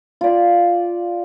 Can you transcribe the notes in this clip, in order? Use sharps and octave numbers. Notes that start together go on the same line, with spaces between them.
F4 D5